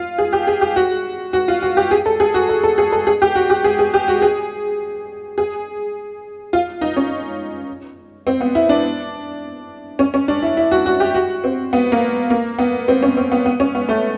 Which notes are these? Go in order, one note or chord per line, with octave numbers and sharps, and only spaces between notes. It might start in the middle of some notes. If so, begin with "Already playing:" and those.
Already playing: F4
G#4
G4
G#4
G4
F#4
F#4
F4
F#4
G4
G#4
A4
G#4
F#4
A4
A4
G#4
A4
G#4
G4
F#4
G4
G#4
G#4
G4
F#4
G#4
G#4
F4
D#4
C#4
C4
B3
E4
D4
C#4
C#4
D4
E4
E4
F#4
F#4
G4
F#4
C4
B3
A#3
A#3
B3
C4
C#4
C4
B3
B3
C#4
B3
A3